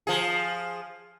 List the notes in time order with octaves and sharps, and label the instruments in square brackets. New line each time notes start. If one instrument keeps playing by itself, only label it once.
[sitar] F3 G#4